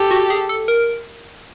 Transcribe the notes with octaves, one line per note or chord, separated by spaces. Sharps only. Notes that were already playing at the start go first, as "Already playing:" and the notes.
Already playing: G4 A4
F#4
G#4
A4
A#4